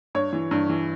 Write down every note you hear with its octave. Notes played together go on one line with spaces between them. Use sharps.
G2 C#5
E3
G2
E3